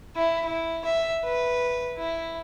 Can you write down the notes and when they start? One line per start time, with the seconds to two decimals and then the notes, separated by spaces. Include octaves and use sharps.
0.16 E4
0.46 E4
0.85 E5
1.24 B4
1.98 E4